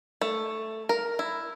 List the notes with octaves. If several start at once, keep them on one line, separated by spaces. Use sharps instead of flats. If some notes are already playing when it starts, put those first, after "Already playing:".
A3
A#4
E4